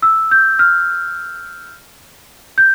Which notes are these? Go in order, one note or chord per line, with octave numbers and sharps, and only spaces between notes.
E6
G6
F6
G6